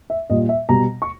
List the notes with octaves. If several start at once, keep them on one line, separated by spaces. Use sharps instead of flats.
E5
A#2 G3 D#5
E5
B2 G3 A#5
C#6